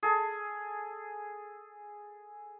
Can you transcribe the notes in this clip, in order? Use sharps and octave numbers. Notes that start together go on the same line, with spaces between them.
G#4 A4